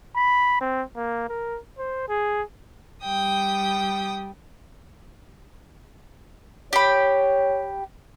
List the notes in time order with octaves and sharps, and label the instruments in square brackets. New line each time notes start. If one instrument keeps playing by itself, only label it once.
[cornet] B5
C4
A#3
A#4
C5
G#4
[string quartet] G3 G5 D#6
[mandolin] G4 B5 [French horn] C#5